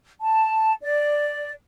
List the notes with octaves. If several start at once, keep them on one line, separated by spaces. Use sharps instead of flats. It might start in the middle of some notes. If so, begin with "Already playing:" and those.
A5
D5